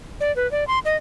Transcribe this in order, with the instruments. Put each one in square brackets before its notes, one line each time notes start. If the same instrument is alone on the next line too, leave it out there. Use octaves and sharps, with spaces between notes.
[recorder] D5
B4
D5
C6
D#5